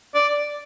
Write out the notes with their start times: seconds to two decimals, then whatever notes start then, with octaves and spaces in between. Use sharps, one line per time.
0.14 D5